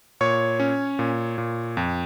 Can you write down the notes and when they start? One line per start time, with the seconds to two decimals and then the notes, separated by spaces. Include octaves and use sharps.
0.21 A#2 C#5 C#6
0.60 C#4
0.99 A#2
1.38 A#2
1.77 F2